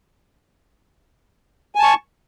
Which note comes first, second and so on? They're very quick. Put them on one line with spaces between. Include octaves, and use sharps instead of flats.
G#5 A5 C#6